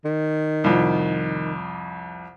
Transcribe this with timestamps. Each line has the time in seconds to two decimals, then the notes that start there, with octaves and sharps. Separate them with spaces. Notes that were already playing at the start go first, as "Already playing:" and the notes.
0.05 D#3
0.64 C2 F2